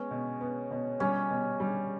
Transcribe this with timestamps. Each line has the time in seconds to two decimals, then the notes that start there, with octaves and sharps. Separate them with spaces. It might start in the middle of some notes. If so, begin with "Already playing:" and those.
Already playing: G#3 B3 C#4
0.11 B2
0.41 B3
0.71 B2
1.00 G3 C#4
1.30 B2
1.60 G3